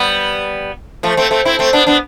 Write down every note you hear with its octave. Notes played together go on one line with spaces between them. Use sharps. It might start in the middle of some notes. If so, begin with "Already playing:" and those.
Already playing: G3 B3
F3 A3
A3 C4
A3 C4
C4 E4
A3 C4
B3 D4
B3 D4